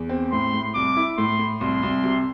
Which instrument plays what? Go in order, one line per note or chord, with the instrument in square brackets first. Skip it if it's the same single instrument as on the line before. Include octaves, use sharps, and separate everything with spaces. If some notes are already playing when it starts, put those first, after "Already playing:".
Already playing: [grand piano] E2
C4
[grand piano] A2 [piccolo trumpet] C6
[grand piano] A2
[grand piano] C2 [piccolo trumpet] D6
[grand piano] E4
[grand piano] A2 [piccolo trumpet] C6
[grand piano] A2
[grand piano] C2 [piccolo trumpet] C6
[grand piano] C2
C3